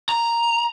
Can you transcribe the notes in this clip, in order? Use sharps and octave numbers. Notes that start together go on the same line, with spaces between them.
A#5